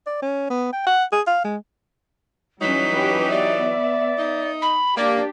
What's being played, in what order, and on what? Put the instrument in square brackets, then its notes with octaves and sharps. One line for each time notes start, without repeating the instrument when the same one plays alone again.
[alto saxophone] D5
C#4
B3
G5
F#5
G#4
F5
G#3
[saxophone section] E3 F#3 D#4 [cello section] G3 C#4 [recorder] B6
[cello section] C#4 G4 B4
[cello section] B3 E5 [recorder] D5
[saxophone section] D#4
[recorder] B5
[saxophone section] A#3 [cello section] D4 G4 [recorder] D5